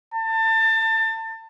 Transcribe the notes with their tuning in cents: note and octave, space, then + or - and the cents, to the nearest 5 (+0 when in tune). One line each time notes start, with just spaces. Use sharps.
A5 +30